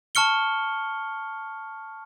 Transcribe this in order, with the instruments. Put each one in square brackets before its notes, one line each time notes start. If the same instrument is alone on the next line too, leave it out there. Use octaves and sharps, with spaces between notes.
[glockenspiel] A5 C#6 F6 C#7 G7